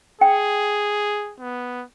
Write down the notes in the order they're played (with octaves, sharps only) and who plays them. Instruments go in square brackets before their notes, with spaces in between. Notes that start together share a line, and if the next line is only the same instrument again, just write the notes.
[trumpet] G#4 [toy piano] G5
[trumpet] B3